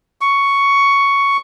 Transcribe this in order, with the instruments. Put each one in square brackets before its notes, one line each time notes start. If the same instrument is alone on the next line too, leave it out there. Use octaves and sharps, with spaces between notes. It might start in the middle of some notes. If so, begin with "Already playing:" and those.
[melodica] C#6